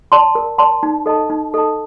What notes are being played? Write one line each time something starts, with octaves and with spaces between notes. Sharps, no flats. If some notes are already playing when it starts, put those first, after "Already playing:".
D5 A5 C6
A#4
D5 A5 C6
D#4
A4 D#5 A5
D#4
A4 D#5 A5